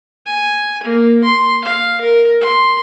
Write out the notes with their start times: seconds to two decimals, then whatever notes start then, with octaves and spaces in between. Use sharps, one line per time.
0.26 G#5
0.83 A#3
1.24 C6
1.64 F5
2.01 A#4
2.41 C6